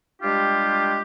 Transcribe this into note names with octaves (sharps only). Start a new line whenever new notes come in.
G3 G#3 D4 F4 G4